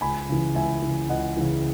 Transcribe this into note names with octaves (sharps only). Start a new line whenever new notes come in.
C#2 G#5 B5
C#3 E3
C#2 E5 G#5
C#3 E3
C#2 D#5 F#5
C#3 E3